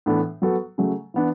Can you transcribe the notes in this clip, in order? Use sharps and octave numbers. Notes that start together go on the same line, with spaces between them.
A2 E3 B3 D4 A4
F#3 B3 F#4 A4
C#3 F#3 A3
E3 B3 D4